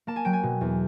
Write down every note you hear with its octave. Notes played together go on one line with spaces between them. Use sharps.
A#3 A5
G#5
F#3 G5
G#5
B2
E2